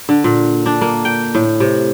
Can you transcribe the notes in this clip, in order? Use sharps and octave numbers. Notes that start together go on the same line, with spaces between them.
D3
A#2
D4
A#3
G5
A2
C3